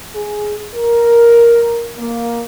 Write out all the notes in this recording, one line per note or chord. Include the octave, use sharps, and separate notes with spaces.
G#4
A#4
A#3